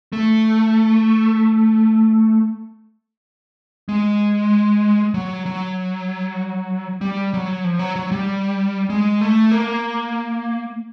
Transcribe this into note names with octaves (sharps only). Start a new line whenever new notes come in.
A3
G#3
F#3
F#3
G3
F#3
F3
F#3
F#3
G3
G#3
A3
A#3